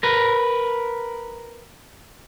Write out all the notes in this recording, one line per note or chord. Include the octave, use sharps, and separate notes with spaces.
A#4 B4